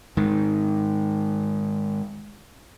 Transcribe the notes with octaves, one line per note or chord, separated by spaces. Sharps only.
G#2 D#3